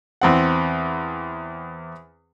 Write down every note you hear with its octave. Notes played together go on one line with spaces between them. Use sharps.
E2 C4 F#5